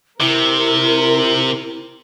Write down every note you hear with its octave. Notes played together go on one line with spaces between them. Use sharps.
C3 E4 A#4